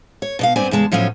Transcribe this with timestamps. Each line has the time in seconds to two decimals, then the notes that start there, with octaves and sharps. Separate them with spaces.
0.22 C#5
0.39 B2 D5 F5
0.56 G2 B3 C4 C5 D5 G#5
0.71 E2 C#3 G#3 A5
0.92 A2 F3 F#3 G#3 C#4